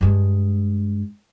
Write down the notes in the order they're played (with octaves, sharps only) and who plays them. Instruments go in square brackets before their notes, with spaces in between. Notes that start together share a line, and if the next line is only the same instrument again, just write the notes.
[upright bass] G2 G#3